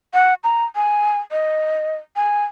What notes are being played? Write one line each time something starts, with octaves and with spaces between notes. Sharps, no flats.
F#5
A#5
G#5
D#5
G#5